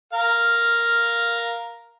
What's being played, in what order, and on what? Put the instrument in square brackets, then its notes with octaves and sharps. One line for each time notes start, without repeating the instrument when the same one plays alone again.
[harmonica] A#4 F5